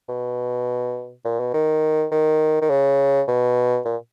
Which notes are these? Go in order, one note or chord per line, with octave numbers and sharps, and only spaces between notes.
B2
A#2
B2
D#3
D#3
D#3
C#3
B2
A#2